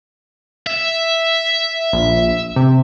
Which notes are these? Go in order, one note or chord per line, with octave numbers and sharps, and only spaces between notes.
E5
A#1
C3